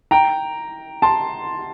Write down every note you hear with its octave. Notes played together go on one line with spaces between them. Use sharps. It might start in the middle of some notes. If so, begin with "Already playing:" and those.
G5 A#5
A5 C6